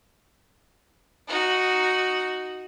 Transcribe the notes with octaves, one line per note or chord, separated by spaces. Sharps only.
D#4 F#4